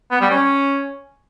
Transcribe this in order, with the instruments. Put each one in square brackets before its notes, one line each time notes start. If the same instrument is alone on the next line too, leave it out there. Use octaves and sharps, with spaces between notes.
[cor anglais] B3
G3
C#4